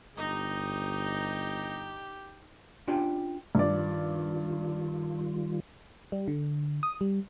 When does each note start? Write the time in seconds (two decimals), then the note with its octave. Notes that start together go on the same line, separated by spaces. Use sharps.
0.16 G1 D#4 G4 D#5
2.87 C#4 D4 F4 G4 D5 G5
3.55 G2 D#3 G3 F4 D5
6.12 G3
6.28 D3
6.83 D#6
7.01 G3